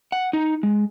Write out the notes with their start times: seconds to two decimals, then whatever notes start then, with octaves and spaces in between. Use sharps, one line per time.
0.12 F#5
0.33 D#4
0.63 G#3